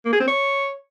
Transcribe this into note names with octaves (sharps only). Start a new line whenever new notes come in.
A#3
G#4
C4
C#5